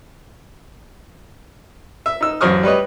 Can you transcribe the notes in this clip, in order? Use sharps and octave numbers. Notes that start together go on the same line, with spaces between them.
E5
D#4 E6
A1 F#2 C5 C#6 D#6 F6
G3 B4 C#5 D#5